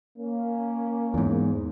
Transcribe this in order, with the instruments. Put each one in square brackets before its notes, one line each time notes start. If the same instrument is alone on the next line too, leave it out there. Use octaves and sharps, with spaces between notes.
[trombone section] A#3 C#4
[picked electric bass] E2 G#2